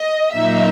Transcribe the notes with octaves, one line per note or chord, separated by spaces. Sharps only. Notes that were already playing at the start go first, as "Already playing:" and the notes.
Already playing: D#5
A#2 F#3 A#3 D#4 E5